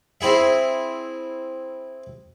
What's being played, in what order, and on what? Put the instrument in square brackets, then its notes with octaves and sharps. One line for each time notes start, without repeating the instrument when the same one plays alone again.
[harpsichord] C4 E4 G#4 E5